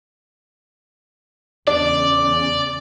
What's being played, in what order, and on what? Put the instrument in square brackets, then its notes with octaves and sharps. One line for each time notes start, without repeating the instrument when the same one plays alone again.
[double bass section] E2 C#3 [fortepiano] D4 [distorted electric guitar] D5